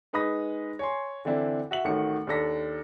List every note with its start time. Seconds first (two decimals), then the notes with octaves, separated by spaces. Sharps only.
0.13 G#3 D#4 B4 B5 D#6 A#6
0.79 C#5 G#5 C6
1.25 D3 E3 C4 D4 E4
1.71 F#4 E5 F#7
1.85 A1 D#3 A3 F#4 C#7
2.27 D#2 D4 A4 A#6 B6